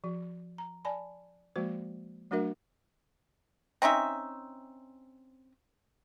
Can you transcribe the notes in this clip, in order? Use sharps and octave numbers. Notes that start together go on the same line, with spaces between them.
F3 F#4
A#5
D5 G#5 A5 B5
F3 G#3 A#3 F#4 C5
F#3 A3 D4 F#4 A#4 E5
C4 C#4 D#4 E5